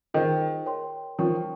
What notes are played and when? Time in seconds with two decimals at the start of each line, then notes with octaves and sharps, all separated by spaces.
0.14 D#3 F4 G#4 C5 D#5
0.66 A#4 C#5 G5 C6
1.18 F3 D#4 A#4 C#5 G5 C#6